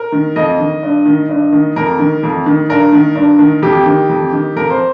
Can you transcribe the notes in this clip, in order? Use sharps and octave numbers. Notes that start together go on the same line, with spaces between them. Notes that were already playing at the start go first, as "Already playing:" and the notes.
Already playing: A#4
D#3
F2 D#5
D#3
G2
D#3
G2
D#3
F2 A#4
D#3
F2
D#3
G2 A#4
D#3
G2
D#3
F2 G4
D#3
F2
D#3
F2 A#4
C5